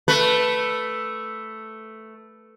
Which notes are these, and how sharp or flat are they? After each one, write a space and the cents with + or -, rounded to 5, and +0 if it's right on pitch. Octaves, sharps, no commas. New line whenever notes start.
A3 +0 B4 +0